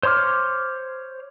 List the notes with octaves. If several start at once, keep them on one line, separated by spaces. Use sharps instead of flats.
C5 C#5 C6 D6 F6